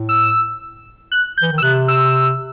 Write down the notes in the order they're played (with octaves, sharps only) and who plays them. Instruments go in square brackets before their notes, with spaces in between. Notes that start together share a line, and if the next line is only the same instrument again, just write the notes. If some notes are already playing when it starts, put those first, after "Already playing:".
Already playing: [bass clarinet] A2
[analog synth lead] E6
F#6
G6
[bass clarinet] E3
D#3
[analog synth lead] E6
[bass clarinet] C3 [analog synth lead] F#6
[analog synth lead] E6